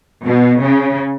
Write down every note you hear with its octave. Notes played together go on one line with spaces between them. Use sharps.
B2
C#3